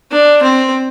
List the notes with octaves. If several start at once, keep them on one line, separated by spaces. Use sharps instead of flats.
D4
C4